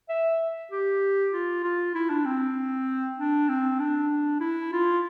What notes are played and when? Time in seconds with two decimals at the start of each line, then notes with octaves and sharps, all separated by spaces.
0.09 E5
0.72 G4
1.33 F4
1.64 F4
1.95 E4
2.10 D4
2.25 C4
3.18 D4
3.49 C4
3.80 D4
4.41 E4
4.72 F4